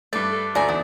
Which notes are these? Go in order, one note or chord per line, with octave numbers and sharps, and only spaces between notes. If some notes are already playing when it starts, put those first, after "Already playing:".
G2 A3 B4 D5 D6 A6
A4
D2 A3 D5 G#5 A#5
E2 D#4 E4 D#6